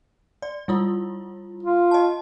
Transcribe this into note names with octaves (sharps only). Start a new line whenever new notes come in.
D5
G3 E4 F4
F4
D#5 A5